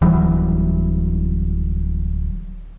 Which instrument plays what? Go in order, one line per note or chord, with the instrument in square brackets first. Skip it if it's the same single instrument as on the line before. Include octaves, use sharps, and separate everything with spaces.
[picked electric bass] D1 E3 F#3 G3